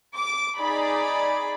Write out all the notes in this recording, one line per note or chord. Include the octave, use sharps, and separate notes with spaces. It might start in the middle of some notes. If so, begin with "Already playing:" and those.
D6
D#4 G#4 D5 B5